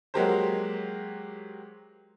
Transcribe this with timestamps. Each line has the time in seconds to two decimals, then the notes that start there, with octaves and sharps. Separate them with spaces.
0.14 F#3 G#3 A#3 G4 A#4 C5